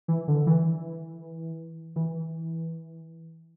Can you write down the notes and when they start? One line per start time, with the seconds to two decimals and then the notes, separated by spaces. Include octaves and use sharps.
0.08 E3
0.28 D3
0.47 E3
1.96 E3